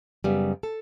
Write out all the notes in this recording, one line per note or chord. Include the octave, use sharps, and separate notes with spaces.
F#2 C#3 G3 B3
A4